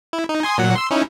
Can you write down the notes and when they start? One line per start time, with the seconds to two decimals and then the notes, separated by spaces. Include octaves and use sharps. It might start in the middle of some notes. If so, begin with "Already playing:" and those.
0.13 E4
0.29 D#4
0.43 G#5 C6 D#6
0.58 A#2 F#3 F#5
0.76 C6 E6
0.91 C#4 D#4 E4